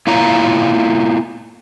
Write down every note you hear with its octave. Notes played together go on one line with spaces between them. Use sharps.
A#3 E4 F4 C#5 A#5